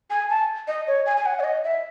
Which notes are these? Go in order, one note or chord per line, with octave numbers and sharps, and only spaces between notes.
G#5
A5
D#5
C#5
G#5
G#5
F#5
C#5
D#5
E5